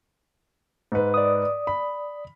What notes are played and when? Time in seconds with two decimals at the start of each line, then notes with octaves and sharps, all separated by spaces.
0.92 G#2 B4
1.14 D5 D#6
1.67 B5